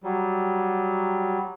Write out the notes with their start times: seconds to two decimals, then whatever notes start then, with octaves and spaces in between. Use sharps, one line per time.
0.04 F#3 G3